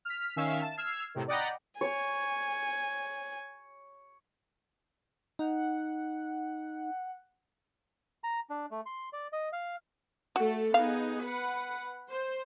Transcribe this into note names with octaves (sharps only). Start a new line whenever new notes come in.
F6 B6
D#3 C#4 E5 F5 E7
A5
E6 F6 G#6 C7
A2 C3 D#3
D5 D#5 F#5 G5 A#5 B5
C#5 G#5
D#4 F#5
A#5
D4
A3
C6
D5
D#5
F5
A3 F#4 A4
B3 D#4 G#4 F5
B4 F#5
C5